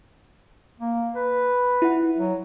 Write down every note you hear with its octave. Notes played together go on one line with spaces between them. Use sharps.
A#3
B4
E4 F#5
F#3